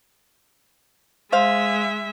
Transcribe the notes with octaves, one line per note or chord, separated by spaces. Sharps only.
G#3 C5 E5 F5